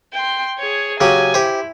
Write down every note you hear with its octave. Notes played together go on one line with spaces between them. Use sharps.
G5 C6
G#4 C#5
C#3 F#3 G4 G#5
E4 G4 C5